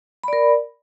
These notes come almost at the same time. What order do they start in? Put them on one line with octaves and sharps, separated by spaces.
B5 D5 A#4